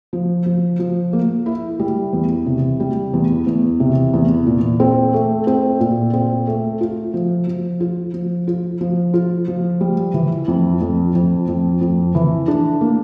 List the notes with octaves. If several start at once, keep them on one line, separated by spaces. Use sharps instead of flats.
F3
F3
F3
A#3
E4
G3
E2
C3
G3
E2
E2
C3
E2
A#2
C4
A3
C4
A#2
C4
A3
F4
F3
F3
F4
F3
F4
F3
F4
F3
G3
E3
F2
F2
F2
F2
F2
E3
D4
A#3